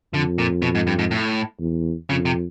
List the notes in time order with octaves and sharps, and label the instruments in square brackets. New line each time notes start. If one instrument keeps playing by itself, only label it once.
[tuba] F2 [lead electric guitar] D3
[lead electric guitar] A#2
B2
G#2
G2
G#2
A2
[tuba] E2
[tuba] F2 [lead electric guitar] C#3
[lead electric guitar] C3